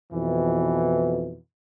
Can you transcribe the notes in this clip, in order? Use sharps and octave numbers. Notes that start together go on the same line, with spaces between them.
F2 B2 E3